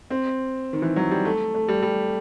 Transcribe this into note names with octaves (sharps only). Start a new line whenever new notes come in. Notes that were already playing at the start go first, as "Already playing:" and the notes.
C4
D#3
E3
F#3
G3
A3
A3
G3
G3